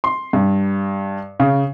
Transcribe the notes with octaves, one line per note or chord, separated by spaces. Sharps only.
C6
G2
C#3